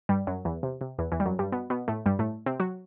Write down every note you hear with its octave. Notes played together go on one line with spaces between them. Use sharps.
G2 G3
F#2 F#3
E2 E3
C3
C3
E2 E3
E2 E3
G3
F#2 F#3
G2 G3
B2 B3
B2 B3
A2 A3
G2 G3
A2 A3
C3 C4
F#3 F#4